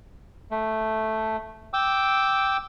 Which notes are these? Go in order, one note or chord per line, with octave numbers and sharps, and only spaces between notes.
A3
G5 D6 E6